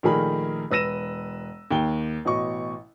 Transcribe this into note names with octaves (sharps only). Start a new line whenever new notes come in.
A#1 D#3 A3 G#4 A#4 B5
E1 B4 E6 A#6 D#7 E7
D#2 G5 G7
A1 B2 D#5 C#6